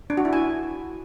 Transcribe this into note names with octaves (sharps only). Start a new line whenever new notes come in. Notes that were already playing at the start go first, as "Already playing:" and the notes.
D4
F#4
E4
G#5